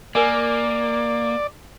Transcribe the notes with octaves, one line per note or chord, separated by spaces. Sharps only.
A#3 A#4 D5 G#5